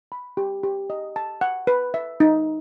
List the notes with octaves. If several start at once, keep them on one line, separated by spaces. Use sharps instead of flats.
B5
G4
G4
D#5
A5
F#5
B4
E5
D#4